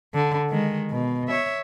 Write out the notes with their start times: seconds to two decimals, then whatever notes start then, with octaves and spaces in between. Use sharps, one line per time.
0.14 D3
0.49 D#3 G#3
0.91 B2
1.28 C#5 E5